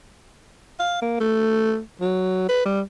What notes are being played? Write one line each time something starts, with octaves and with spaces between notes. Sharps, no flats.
F5
A#3
A3
F#3
B4
G3